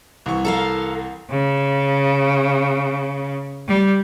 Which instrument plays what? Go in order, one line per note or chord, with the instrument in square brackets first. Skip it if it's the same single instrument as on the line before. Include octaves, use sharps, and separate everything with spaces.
[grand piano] C2 E3 C#6
[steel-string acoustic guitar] A4 A#4 F5
[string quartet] C#3
G3